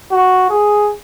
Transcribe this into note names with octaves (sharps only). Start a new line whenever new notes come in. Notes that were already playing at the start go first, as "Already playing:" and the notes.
F#4
G#4